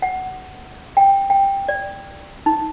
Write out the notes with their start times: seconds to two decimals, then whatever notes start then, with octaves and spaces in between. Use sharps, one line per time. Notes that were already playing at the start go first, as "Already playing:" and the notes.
0.02 F#5
0.97 G5
1.30 G5
1.68 D5
2.46 D#4